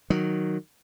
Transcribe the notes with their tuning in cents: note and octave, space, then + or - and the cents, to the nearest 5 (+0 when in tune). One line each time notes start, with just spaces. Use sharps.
D#3 -5 F#3 +0